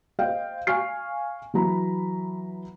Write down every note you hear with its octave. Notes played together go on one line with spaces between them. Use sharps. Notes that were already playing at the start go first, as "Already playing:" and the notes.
C5 D#5 F5 G5
F5 G#5 C#6 F6 C7
E3 F#3 A#5 B5